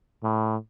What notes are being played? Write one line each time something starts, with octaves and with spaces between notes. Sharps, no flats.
A2